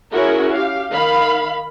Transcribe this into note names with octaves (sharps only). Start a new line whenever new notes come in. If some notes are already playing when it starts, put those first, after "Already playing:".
C#4 E4 F#4 G#4 A#4
G4 F5
D#3 F5 B5